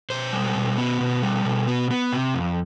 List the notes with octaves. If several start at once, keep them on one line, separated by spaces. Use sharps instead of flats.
B2 C5
G3
B2
B3
B2
G3
B2
B3
B3
C3
F2